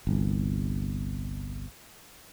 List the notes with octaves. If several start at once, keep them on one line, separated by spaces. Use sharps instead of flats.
G1 C2